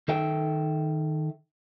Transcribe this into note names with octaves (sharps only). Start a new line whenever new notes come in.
D#3 A4 E5 G5